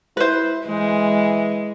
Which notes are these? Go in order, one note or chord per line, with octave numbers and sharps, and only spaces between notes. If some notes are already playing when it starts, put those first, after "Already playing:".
E4 B4 C5
E3 G#3